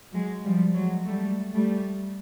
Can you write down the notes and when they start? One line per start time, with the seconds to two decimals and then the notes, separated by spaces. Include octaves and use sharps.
0.13 F#3 G#3
0.45 F3 G3
0.75 F#3 G#3
1.07 G3 A3
1.54 G3 A3